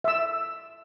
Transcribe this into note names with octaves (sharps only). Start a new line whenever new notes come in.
E5 E6